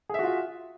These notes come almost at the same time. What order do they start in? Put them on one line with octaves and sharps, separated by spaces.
G#4 E5 F#4 F4